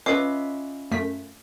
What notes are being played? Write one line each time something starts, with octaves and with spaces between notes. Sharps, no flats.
C#4 F4 B4 D#5 E5 D6 C7
F#2 A3 B6